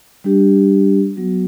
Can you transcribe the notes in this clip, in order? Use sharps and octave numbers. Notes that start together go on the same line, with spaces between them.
G3 D4 G4
F#3 B3 F#4